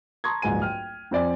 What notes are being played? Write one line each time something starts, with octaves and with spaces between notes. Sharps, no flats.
A5 A#5 C6 C#6 D#6 G#6
D1 A#1 G#2 G#5 D#7
G5 F6
F2 C4 D5 G#5